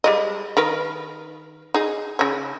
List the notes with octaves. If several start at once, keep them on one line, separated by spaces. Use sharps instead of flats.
G3 G#3 D#5
D#3 A#4 B4
D#4 G#4
C#3 C#4